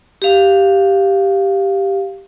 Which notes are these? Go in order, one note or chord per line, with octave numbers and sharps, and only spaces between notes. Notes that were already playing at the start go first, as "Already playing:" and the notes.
G4 F5